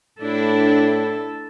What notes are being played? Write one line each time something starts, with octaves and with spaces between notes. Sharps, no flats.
A2 D4 E4 A4